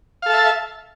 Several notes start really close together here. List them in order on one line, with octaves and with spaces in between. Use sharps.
F5 A4 A5 E5